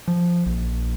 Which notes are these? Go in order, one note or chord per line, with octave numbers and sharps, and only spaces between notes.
F3
A#1